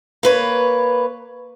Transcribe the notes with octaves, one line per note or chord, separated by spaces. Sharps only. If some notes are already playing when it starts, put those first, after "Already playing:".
A#3 B4 C#5